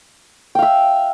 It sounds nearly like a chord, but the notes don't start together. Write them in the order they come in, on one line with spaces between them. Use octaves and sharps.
G5 F5 E5